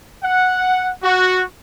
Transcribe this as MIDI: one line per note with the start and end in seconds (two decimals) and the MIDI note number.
0.24 0.91 78
1.03 1.43 66